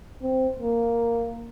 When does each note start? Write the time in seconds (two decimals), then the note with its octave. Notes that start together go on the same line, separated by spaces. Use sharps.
0.23 C4
0.59 A#3